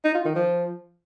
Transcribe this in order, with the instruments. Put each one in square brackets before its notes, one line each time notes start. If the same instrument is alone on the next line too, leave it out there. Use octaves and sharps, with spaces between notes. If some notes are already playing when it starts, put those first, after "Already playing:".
[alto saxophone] D#4
F4
D#3
F3